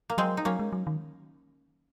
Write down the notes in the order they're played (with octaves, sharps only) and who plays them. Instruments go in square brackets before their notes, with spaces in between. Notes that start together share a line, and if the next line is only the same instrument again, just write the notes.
[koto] A#3
[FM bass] F#3 [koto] G#3 C4
[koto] D#4
[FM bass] F#3 [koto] A#3 C#4
[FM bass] G#3
F#3
D#3